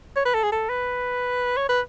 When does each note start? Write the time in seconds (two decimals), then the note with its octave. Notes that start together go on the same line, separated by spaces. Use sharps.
0.16 C#5
0.25 B4
0.34 A4
0.43 G#4
0.52 A4
0.69 B4
1.57 C#5
1.69 B4